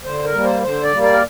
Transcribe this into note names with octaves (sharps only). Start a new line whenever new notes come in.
D3 C5
A#4
G3 A#3
C5
D3 C5
D5
G3 A#3
D5
A#4